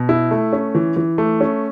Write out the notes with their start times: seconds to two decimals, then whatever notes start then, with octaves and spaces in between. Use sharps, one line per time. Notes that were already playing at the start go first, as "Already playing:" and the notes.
Already playing: B2
0.09 E4
0.31 A3
0.53 C#4
0.75 E3
0.96 E3
1.18 A3
1.41 C#4